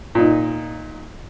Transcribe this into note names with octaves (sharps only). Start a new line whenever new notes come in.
A#2 D#4